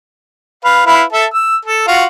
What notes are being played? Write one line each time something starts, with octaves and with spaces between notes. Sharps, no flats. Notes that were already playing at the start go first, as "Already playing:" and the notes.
B4 F5
E4 B4 F5
A4 E5 A5
E6
A4
F4 F#4 F#5